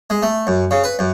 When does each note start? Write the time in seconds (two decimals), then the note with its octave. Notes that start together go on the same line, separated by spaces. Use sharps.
0.10 G#3
0.23 A3
0.47 F#2
0.71 C#3
0.84 B4
0.99 F#2